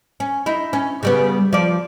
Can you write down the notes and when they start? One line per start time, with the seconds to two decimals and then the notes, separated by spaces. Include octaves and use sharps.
0.20 C#4
0.46 D#4 E4
0.73 C#4
1.03 C#3 G3 B3
1.53 F3 D5